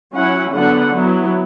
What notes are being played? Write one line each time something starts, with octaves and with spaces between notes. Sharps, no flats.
F#3 C#4 E4 F#5
D3 F#3 B3 D4 F#5
F#3 B3 E4